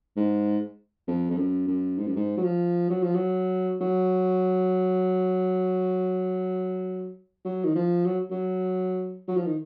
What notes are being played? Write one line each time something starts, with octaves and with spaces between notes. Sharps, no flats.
G#2
F2
F2
F#2
F#2
G#2
F#2
G#2
F#3
F3
F#3
F3
F#3
F#3
F#3
D#3
F3
F#3
F#3
F#3
F3
D#3